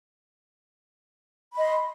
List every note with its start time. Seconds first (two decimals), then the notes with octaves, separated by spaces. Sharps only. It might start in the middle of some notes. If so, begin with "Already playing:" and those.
1.54 B5
1.57 D#5
1.61 C6